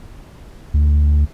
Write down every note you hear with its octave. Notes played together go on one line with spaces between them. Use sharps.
D2